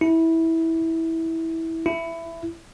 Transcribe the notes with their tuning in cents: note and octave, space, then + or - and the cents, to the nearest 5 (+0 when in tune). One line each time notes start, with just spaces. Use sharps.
E4 -15
E4 +15